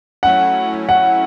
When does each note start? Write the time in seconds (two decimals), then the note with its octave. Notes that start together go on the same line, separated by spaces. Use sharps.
0.23 F#3 A3 C#4 E4 F#5
0.89 F#5